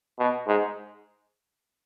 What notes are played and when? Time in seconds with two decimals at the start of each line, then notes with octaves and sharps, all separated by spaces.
0.19 B2
0.48 G#2